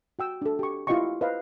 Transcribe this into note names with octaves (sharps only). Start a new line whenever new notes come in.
F#4 G5 E6
D4 A4
G4 C#6
E4 F4 G4 D#5 G5 C#6
B4 C5 D#5 F5